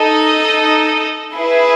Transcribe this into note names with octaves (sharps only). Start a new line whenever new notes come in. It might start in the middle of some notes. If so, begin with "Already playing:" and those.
Already playing: D#4 A4 D#5
E4 G#4 B4